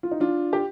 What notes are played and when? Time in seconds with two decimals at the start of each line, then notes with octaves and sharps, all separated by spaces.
0.03 F4
0.11 D#4
0.20 D4 F4
0.53 G4